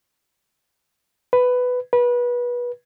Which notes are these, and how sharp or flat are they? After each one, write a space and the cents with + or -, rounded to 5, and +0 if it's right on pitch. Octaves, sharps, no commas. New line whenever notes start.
B4 +10
B4 -25